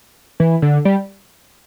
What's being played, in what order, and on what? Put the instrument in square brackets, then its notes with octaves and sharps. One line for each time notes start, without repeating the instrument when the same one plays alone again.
[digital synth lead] E3
D3
G3